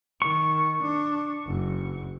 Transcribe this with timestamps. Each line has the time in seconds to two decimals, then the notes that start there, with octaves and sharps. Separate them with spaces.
0.22 D#3 C#6
0.83 D4
1.46 F#1